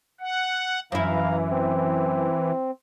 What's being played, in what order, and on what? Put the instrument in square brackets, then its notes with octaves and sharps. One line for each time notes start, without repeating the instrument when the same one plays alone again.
[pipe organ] F#5
[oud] F#2 E4 [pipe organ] E3 [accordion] F5 A#5
[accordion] C4